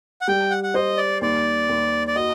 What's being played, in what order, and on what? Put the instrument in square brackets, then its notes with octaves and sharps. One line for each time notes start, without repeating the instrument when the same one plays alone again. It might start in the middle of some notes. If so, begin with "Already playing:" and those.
[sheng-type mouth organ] F#5
[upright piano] G3 [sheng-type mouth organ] G5
[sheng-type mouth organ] F#5
F#5
[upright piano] C5 [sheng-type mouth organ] D#5
[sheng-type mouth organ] D5
[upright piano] D#2 [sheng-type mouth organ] D5
[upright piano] D#2
[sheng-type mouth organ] D5
[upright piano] F#4 [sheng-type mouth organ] D#5